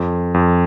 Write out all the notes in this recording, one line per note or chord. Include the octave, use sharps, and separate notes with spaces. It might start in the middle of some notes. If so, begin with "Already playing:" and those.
Already playing: F2
F2